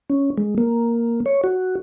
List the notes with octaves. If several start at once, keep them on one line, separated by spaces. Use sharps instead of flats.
C#4
G#3
A#3
C#5
F#4